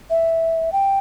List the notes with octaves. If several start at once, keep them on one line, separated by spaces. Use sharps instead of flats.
E5
G5